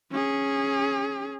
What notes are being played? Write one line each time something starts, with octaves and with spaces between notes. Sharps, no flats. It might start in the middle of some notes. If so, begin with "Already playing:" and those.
C#4 G#4